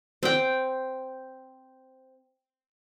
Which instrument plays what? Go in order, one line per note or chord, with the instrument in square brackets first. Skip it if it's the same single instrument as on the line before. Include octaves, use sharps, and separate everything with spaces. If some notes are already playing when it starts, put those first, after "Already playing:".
[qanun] C4 G5